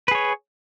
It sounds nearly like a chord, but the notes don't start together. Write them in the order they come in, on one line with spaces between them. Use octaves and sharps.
B4 G#4 C#5